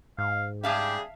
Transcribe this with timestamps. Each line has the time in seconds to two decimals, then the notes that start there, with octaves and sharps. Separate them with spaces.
0.18 G#2 F5
0.64 C#3 G3 G4 G#4 E5 F5 A5